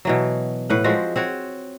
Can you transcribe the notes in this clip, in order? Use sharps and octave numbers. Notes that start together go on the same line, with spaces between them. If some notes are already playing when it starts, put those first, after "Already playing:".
B2 E3 F#3
A2 B4 F#5
F3 G#3 C4 F#4
C4 F#4 C#5